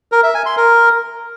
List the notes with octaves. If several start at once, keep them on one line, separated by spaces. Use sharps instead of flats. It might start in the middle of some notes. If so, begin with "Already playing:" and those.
A#4
E5
G#5
C6
A#4